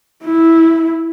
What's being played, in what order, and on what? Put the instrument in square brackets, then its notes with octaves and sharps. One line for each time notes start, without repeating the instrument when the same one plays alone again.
[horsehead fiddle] E4